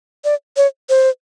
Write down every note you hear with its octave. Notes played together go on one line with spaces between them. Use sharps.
D5
C#5
C5